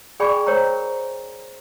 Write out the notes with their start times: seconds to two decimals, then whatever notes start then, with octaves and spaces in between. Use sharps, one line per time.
0.20 G#4 D5 G5 G#5 B5 C#6
0.46 A#4 C5 C#5 G5 A#5